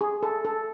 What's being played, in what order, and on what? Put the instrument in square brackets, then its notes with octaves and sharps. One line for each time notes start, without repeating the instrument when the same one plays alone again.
[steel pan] G#4
A4
A4